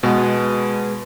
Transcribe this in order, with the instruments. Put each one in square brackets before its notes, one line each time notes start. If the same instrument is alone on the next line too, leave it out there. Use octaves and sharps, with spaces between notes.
[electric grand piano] B2 [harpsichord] G#3 B3